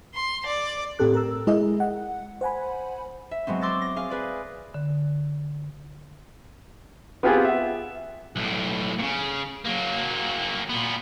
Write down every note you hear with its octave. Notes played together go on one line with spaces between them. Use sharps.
C6
D5
A2 C4 G4 A4 F#6
A#4 A#5 E6
G#3 E4 G#4 D#5
F#5
C5 F#5 G#5 B5
E5
F#3 G#3 B3 C4
C6 D6 E6 A6 A#6
A#6
G#4 F5
G#4 B4 D5
D3
B3 C4 F4 G4 G#4
E5 F#5
B1 A2
A#2 C#3
F#3 A#3
A#2 B3